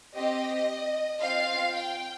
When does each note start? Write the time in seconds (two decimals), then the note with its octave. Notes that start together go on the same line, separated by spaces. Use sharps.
0.16 C4 G4 D#5
1.22 C4 F4 F5
1.75 G5